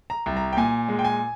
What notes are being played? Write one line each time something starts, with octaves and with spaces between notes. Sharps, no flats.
A#5
C2
A#5
G5
A#2 G#5
G#3
G5
G#5